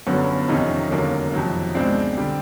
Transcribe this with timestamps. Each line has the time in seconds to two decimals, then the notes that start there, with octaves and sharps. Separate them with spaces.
0.07 G1 F#2 D3 F#3 B3 C#4
0.49 G1 F2 C3 D#3 C#4 D#4
0.90 E1 D#2 D3 F#3 A#3
1.33 F2 C3 D#3 F#3
1.75 C#2 B2 G#3 C4 D4
2.17 D3 G3